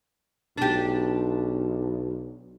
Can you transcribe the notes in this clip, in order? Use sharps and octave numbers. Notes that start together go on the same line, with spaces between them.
B1 D4 G4